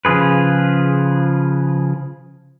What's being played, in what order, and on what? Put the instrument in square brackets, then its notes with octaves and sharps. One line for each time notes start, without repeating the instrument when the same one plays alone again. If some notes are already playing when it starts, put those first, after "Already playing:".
[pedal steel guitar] C#3 F3 F4 G#4 B4